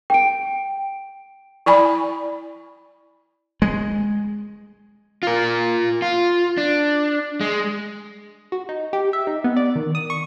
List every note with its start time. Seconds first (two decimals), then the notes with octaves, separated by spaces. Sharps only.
0.10 G5 D7
1.66 E4 D5 G#5 B5
3.62 G#3
5.23 F4 A#4
6.02 F4
6.58 D4
7.41 G#3
8.52 F#4
8.69 D#4
8.93 G4
9.13 E5
9.27 D#4
9.44 B3
9.56 D5
9.75 D#3
9.95 D#6
10.10 C#6